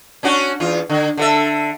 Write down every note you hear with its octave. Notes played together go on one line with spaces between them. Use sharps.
C#4 D4 F#4
E2 F4
D3
D3 A4 E5